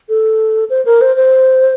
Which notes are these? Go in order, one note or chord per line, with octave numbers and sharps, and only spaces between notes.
A4
C5
A#4
C5
C5